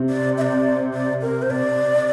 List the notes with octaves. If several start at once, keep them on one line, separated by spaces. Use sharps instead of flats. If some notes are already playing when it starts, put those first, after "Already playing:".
Already playing: C3
D5
E5
D5
D5
A#4
C5
C3 D5